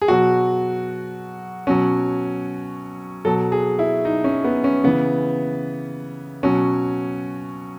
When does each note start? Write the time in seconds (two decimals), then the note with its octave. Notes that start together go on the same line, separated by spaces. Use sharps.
0.02 G#4
0.08 B2 F#3 F#4
1.67 B2 F#3 C#4
3.25 B2 F#3 A4
3.52 G#4
3.79 E4
4.05 D#4
4.24 C#4
4.44 B3
4.64 C#4
4.84 C#3 E3 B3
6.43 B2 F#3 C#4